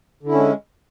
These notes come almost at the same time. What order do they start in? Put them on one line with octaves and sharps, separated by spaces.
D3 E4 C#4 G#3